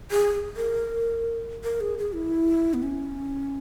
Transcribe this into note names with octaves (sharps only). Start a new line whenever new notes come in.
G#4
A#4
A#4
G#4
G#4
E4
B3
C#4